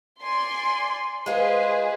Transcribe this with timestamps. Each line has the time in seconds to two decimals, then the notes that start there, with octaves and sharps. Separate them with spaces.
0.23 D5 G#5 C6
1.26 G#3 F4 G#4 B4 C5